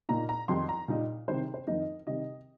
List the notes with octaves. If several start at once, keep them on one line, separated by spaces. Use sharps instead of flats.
A#2 A#3 D#4 A#5
A#5
F2 D#3 G3 D#4 C6
A#5
A#2 G3 D#4
C3 D#3 G3 C5
C5
F2 D#3 A#3 D#4 D#5
C3 D#3 G3 D#5